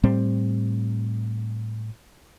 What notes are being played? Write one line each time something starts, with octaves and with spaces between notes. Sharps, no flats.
A2 G3 C4